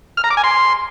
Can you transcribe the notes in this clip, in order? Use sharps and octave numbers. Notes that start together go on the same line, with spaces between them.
F6
A#5
D6
G#5
C6